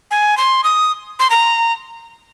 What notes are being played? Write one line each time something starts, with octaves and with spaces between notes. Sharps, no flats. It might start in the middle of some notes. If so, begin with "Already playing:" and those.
G#5
C6
D#6
C6
A#5